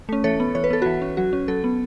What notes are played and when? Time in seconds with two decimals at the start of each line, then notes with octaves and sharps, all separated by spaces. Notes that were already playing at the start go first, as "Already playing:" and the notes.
0.09 A3 C#4
0.24 E3 A4 C#5
0.40 B3
0.55 E3 C#5
0.64 B4
0.70 B3 A4
0.82 E3 F#4 B4
1.02 C#4
1.17 F#3 F#4
1.33 C#4
1.48 F#3 A4
1.64 B3